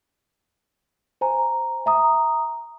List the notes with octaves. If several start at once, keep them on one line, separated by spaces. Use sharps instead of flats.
C5 G#5 A#5
E5 A#5 D#6